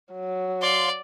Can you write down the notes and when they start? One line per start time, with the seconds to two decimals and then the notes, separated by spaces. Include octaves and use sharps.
0.13 F#3
0.62 D5 F5 C6